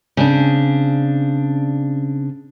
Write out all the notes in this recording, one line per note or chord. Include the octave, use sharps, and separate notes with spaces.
C#3 C4 D4